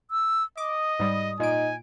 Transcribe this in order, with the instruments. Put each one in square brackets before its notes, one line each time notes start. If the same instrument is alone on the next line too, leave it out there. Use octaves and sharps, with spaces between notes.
[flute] E6
[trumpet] D#5 [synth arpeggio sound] D6 [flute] D#6
[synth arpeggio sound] G#2 G3
[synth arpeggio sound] A#2 D7 [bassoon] D#4 [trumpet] G#5